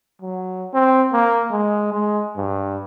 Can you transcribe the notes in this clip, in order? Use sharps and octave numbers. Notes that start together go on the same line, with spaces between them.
F#3
C4
A#3
G#3
G#3
G2